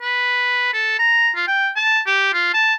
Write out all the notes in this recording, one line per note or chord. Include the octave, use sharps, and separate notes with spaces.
B4
A4
A#5
F4
G5
A5
G4
F4
A5